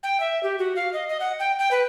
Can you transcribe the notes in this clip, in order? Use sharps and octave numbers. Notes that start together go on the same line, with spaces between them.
G5
E5
G4
F#4
F5
D#5
D#5
F#5
G5
G5
B4